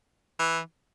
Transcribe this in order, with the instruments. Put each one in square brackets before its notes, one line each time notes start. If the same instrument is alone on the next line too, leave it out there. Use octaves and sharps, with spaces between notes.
[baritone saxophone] E3